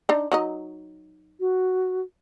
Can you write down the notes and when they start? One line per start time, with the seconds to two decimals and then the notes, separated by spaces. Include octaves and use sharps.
0.09 D4 D#4
0.32 F#3 D#4 D#5
1.40 F#4